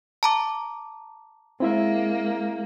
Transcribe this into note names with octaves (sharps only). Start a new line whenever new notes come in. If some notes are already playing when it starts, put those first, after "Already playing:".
A5 A#5 D6
G#3 A#3 C4 E4 E5